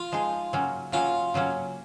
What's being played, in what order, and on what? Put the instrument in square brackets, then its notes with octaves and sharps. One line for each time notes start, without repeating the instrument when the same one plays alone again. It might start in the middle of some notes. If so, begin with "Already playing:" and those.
Already playing: [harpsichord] F4
[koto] F3 G#3 D#4 G#4
C#3 F#3 A#3 C#4
[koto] C#3 F#3 A#3 C#4 [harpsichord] F4
[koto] C#3 F#3 A#3 C#4